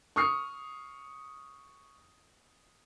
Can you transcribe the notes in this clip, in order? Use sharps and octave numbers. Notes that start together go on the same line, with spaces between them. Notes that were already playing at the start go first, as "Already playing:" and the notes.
C#6 D#6 F6 C7